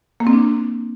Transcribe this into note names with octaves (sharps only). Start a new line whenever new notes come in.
A#3
C4
D4